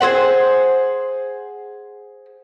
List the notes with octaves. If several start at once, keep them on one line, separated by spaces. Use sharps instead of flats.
G#4 A4 C5 F#5